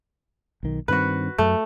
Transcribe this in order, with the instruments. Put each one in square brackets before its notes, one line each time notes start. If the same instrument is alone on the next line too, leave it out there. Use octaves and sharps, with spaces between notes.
[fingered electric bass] B1 D#3
[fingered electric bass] G2 D#3 C4 [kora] F#4 B4
[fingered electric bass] F#2 [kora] A3